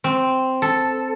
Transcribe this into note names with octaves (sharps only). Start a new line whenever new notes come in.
C4
A4